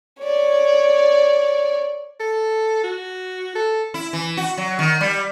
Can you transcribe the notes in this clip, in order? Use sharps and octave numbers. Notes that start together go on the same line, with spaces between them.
C#5 D5
A4
F#4
A4
E4
E3
F#4
F#3
D#3
G3